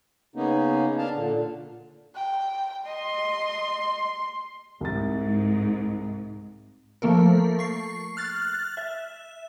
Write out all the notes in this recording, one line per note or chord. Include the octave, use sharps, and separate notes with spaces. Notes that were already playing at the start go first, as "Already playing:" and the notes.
C#3 A#3 B3 C#4 D#4
D4 F5 A5
A#2 D3
G5
D#5 C6
C2 G#2 A6
F3 A3 A#3 A4 A#4
C#6 C7
F6 F#6 A6
E5